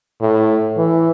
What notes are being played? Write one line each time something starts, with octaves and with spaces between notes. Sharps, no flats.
A2
E3